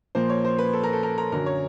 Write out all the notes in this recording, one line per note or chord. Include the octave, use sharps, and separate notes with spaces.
A#2 F3 A#3 C5
C#5
C5
B4
A4
A#4
A4
A#4
A#4
F#2 D3 F#3 A#4
C#5